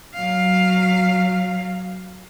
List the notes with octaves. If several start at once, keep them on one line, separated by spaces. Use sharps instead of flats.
F#3 F5